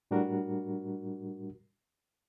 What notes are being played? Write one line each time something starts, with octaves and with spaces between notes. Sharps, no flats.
A2 G3 D4 F#4 A#4